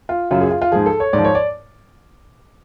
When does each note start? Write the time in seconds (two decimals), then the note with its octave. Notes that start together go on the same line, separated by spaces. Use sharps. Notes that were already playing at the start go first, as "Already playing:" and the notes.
0.09 F4
0.31 F#2 C#3 F#3 F4
0.41 G#4
0.51 F4
0.62 F4
0.72 G#2 F3 G#4
0.86 A4
1.00 C#5
1.13 G#2 D5
1.18 F3
1.25 C#5
1.35 D5